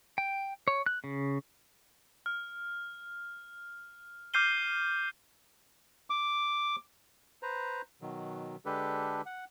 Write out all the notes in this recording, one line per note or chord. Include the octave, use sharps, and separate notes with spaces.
G5
C#5
F#6
C#3
F6
D6 F6 G6 C7 D#7 G7
D6
B4 C5 A#5
B2 D#3 F#3
D3 G#3 D4 G4 A4 B4
F#5